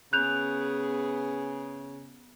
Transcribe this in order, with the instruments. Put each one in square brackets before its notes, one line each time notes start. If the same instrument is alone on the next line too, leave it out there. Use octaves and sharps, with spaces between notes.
[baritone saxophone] C#3 [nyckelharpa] B3 G#4 [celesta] F#6 G6 F7